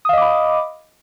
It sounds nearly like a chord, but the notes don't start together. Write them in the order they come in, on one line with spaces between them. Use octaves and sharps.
D#6 F5 D#5 D6 B5